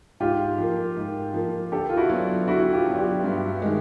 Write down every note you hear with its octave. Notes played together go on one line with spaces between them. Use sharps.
G#2 F4 G4
F3 A#3
G#2
F3 A#3
D3 G4 A4
F4
E4 F#4
F#3 B3 D4
D3 E4 F#4
F4 G4
F#3 B3 D4
F4 G4
G2
D#3 G#3